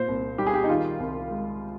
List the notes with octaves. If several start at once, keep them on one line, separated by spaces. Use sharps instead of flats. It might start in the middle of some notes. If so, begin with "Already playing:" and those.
Already playing: A#2 C5
C2
G3 G4
G#4
G4
D#4
D#3 F4
C2
G#3